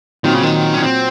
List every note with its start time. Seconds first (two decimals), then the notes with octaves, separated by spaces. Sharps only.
0.24 A#2 D#3 F#3 C4
0.34 C#3
0.43 D#3
0.74 C#4
0.83 C4